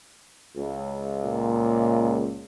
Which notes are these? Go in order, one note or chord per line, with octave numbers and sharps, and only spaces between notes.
C#2
A#2